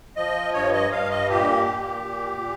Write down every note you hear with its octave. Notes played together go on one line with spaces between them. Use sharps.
F3 D#5
G2 C#5
D#5
G2 F5
D#5
A#2 G4
A#2
A#2
A#2